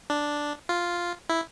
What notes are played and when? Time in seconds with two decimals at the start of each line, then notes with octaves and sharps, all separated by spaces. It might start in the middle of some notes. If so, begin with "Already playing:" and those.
0.10 D4
0.69 F4
1.30 E4